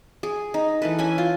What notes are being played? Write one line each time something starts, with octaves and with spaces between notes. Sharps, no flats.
G#4
D#4
E3 A3 B4
C#4 E4 G#5
F4